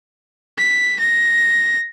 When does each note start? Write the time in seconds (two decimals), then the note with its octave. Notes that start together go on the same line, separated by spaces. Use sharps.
0.58 B6
1.00 A#6